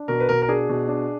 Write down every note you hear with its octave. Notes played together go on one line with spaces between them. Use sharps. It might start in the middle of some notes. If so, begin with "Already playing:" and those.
Already playing: D4
B2 A#4
B4
B2 A#4
A#4
D4 G#4
B2
D4